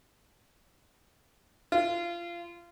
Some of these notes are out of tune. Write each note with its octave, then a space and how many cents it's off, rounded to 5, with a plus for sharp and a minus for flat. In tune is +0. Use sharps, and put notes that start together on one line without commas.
F4 -25